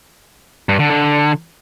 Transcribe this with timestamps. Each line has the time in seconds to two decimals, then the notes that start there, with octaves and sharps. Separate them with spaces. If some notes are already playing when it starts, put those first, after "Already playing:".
0.69 G2
0.80 D3
0.90 D3